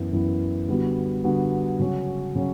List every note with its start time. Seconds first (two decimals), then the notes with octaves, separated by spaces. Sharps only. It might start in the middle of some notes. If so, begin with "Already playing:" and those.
Already playing: F#2 E3 B3 E4 B4
0.13 F#2 E3 B3 E4 B4
0.68 D3 G3 B3 F#4
1.24 D3 G3 B3 F#4
1.79 C#3 F#3 C#4
2.35 C#3 F#3 C#4